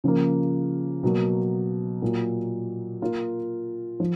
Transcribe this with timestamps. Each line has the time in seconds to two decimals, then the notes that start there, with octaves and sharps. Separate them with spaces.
0.04 C#3 F3 A#3
1.03 B2 F#3 A#3
2.02 A#2 F#3 A#3
3.02 A#3 F4 A#4
4.00 F3